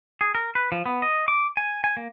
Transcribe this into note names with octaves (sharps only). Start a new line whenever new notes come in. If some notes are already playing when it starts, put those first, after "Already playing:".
G#4
A#4
B4
F3
B3
D#5
D6
G#5
G#5
A#3